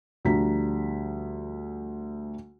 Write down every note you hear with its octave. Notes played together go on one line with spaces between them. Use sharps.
D2 F3 G3 D4 A#5 B6